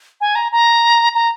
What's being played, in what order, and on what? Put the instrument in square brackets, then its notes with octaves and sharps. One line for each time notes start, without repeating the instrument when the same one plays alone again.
[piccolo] G#5
A#5
A#5
A#5